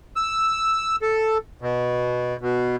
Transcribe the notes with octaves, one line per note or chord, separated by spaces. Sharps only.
E6
A4
B2
B2